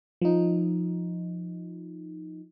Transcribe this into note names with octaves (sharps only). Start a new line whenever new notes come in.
F3 D#4